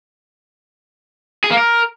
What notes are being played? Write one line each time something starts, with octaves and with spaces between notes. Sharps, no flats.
G#4
A#3
A#4